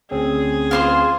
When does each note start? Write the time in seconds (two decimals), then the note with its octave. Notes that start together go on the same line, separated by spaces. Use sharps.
0.11 D2 C4 C#4 G#4
0.71 F4 C5 C6